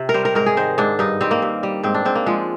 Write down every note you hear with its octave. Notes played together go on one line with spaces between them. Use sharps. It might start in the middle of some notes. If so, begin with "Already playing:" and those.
Already playing: C3
A#4
G3 C5
A#4
G#2 A#4
G#4
D#3 C5
G#2 D4
G2 D#4
G3 C4
A#3
G2
G3
G#2 C4
D4
G#2 C4
A#3
F3 G#3